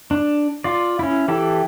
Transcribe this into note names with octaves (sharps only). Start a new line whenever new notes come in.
D4
F4 D5
C#4 E4
E3 E4 G4 A4